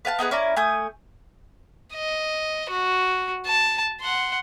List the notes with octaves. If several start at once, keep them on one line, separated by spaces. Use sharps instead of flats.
B4 F5 G#5 A5
B3 D#4 G#4 B4
C#4 E4 D5 A#5
A3 G#5 D#6 G6
D#5
F#4
A5
F#5 C6